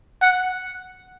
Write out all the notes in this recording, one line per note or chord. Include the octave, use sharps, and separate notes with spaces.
F#5